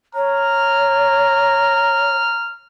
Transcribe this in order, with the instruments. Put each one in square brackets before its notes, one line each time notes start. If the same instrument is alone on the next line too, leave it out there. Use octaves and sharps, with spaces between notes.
[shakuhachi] C#5 [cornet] A#5 [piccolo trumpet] F6